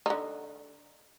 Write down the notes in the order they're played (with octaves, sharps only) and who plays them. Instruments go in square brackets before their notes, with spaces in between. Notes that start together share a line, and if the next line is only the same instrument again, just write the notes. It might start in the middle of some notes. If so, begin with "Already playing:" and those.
[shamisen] D3 D#4